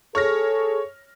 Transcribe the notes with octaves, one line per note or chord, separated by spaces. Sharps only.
G#4 A4 C#5 F6 A#6